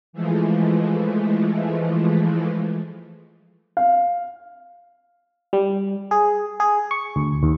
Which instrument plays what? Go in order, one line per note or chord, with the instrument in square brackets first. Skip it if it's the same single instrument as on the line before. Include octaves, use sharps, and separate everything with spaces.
[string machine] E3 F3 G#3 A3
[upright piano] F5
[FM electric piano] G3
G#4
G#4
C#6
D2
D#2